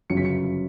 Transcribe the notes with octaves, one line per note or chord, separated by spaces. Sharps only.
G1 F#2 C#3 F#3 C#4 C#7
B6
C#7